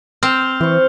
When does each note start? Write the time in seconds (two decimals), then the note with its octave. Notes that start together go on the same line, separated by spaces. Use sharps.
0.23 C4 F6 G6 F7
0.61 E3 C5 C#6